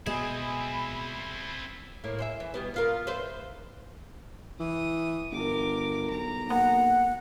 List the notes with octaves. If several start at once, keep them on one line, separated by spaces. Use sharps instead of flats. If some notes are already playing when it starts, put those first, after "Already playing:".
B2 G#3 C4 E4 G#4 B5
A2 A#3 E4
C4 G#4 E5
E3
B2 G3 B3
B3 F4 A#4
B4 C5 E5
E3 D#6
G1 A#4 D6
B1 A#5
A#3 F#5